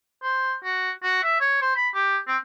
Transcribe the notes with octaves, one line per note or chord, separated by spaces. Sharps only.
C5
F#4
F#4
E5
C#5
C5
B5
G4
C4